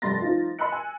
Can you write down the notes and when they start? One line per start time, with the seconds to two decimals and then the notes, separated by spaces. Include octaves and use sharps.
0.02 F1 G2 C6 A6 A#6
0.22 F3 D#4 F4
0.59 D#5 B5 C6 E6 F#6 C#7
0.72 G#5